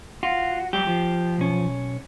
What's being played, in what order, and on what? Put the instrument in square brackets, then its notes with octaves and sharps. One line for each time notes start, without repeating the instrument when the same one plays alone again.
[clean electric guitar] F4 [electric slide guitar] F#4
[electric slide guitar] F#3 G3 [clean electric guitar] G4
[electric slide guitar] F3
[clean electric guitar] B1 C#4